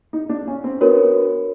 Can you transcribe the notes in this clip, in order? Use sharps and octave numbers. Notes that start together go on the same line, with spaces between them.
D#4
D4
C#4
C4
B3 D4 F#4 A#4 C#5